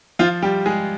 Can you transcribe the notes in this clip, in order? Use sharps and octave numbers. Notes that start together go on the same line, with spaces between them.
F3 F4
G3 G4
G#3 G#4